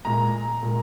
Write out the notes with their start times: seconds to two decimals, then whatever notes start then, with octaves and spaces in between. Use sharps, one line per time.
0.05 A#2 G#3 A#5
0.63 A#2 G#3